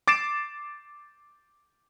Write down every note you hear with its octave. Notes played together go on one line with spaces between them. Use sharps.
D6 A6 C7 D7 E7